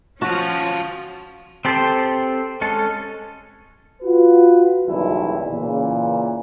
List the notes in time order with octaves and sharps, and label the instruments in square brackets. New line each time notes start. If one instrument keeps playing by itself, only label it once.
[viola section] F3 C#4 [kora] F#4 [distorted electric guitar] F5 A5
[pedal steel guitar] C4 G4 A4 C5 G5
G#3 C#4 A4
[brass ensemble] F4 F#4 B4
F#1 B1 E2 D#3 G3 E4
A#2 C#3 E3